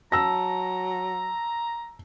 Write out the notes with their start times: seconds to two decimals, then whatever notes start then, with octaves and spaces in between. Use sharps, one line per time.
0.12 F#3 A5 A#5 E6 A#6